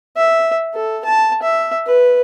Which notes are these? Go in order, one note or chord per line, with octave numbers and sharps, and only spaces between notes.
E5
A4
A5
E5
B4